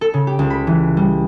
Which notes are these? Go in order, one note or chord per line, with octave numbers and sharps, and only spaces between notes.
A4
C#3
G4
C#2
B5
E3
G3